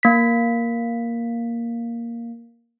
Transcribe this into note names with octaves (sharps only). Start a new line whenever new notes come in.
A#3 B6